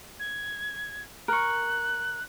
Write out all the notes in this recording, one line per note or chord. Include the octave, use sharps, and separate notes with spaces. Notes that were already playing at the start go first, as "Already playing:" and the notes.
G#6
A#4 C#6 F#6